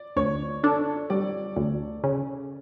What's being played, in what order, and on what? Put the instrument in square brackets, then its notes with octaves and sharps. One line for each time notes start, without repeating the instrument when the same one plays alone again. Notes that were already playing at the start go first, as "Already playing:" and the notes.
Already playing: [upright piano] D5
[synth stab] D2 [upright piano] C#5
[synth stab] D4 [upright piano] A4
[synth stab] G3 [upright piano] D5
[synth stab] D2
C#3